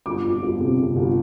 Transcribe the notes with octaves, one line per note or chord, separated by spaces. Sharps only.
G1 D6
F2
G1
C3
C3
G1